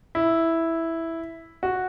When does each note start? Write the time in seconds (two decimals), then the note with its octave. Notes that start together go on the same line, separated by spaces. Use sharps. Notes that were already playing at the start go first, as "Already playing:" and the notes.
0.15 E4
1.63 F#4